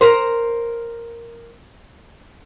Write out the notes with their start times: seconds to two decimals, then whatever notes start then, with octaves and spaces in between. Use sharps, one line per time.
0.01 A#4 C5